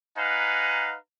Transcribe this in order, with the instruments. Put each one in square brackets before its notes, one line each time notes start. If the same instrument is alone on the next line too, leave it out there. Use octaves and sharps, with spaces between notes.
[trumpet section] D#4 B4 F5 F#5 G#5 A#5